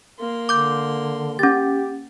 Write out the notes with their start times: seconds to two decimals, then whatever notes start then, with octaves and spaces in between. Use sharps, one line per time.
0.19 A#3 C6
0.49 D3 D6 G6
1.39 C#4 G4 A6